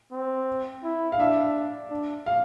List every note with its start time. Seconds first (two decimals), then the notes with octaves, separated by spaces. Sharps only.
0.12 C4
0.84 E4
1.12 F5
1.19 D4 E5
1.91 D4
2.26 F5